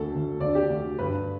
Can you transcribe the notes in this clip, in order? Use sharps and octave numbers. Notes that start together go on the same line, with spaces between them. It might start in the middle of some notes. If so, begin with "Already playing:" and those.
Already playing: D2 D3 A4
D2 D3
D2 D5
D3
G4
D2 D3
G2 D3 B4